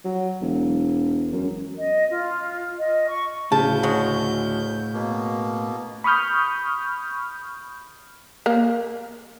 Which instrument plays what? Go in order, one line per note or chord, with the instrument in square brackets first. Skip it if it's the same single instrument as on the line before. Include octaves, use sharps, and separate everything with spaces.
[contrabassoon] F#3
E1
F#2
[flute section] D#5
F4
D#5
C#6
[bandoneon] D2 G6 [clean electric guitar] A2 [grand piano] C#3 [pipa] A5
[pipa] F#3 G#3
[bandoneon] B2 A#3
[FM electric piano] B5 C#6 D#6 F6 G6
[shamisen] A#3